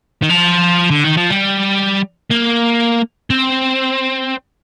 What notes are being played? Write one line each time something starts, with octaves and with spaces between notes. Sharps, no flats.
D#3
F3
D3
D#3
F3
G3
A#3
C4